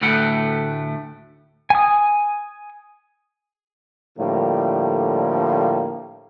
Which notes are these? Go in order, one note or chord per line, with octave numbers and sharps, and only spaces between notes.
D2 A2 A3 B4 F#5
G#5 D#6
A2 D3 F3 G3 A#3